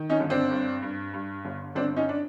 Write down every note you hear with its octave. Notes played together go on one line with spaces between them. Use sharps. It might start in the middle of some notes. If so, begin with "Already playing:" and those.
Already playing: D#3
C#4 D#4
G1
C4 D4
G2
G2
G2
G1
G1 C4 D4
C#4 D#4
D4